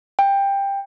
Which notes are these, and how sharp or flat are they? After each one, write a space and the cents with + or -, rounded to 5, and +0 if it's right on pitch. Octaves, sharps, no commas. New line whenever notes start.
G5 +15